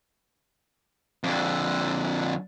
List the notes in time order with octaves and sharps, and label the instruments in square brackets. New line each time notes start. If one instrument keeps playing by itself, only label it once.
[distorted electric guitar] F2 D3